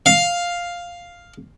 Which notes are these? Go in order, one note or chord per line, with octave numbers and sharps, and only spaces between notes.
F5